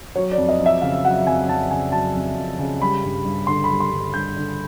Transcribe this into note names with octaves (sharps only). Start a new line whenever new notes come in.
F#3 C#5
D5
F2
D#5
F2
E5
C#3 F5
F#3 F#5
F2 G#5
F2 A5
C#3 G#5
F#3 A5
F2
F2
C#3
G3 B5
G2
G2
D3 C6
B5
G3
C6
G2
G2 G6
D3